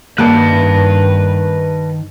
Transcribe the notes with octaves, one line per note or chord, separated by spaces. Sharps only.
G2 D#3 G3 A#3 B4 A5 F#6